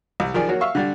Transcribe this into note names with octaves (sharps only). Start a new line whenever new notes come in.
C2
D#3 F3 G#4 D5
F#3 A#3 F#4 C#5
E5 F5 C#6 E6
D3 G3 D4